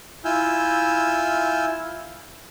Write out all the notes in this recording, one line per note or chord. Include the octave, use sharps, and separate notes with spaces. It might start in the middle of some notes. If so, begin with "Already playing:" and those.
E4 F4 G#5 E6 F6 G6